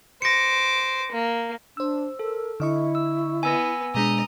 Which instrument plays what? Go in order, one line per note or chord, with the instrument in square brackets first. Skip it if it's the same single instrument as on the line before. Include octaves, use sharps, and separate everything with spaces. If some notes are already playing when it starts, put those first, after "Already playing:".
[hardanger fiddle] C5 D6 [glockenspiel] A#6 C#7
[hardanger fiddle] A#3
[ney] D4 [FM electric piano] C5 E6
[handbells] A4 [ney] A#4
[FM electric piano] D3 D#5 C#6 [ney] E4
[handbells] E6
[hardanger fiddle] B3 [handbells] G#5 E6 A#6
[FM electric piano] B2 G#3 D4 [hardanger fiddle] D#5 A#5